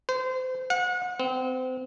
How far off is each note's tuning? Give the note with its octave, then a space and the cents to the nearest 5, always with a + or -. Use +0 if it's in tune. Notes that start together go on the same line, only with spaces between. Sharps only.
C5 -30
F#5 -35
C4 -30